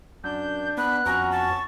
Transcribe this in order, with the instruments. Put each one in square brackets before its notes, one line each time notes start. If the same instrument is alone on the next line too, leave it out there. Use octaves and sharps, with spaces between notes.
[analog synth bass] F#2 [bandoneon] D4 [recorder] G6
[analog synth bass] B3 [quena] B5 [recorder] F#6
[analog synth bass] F2 [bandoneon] B3 C#4 F#4 [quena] A#5
[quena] A5 [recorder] C#6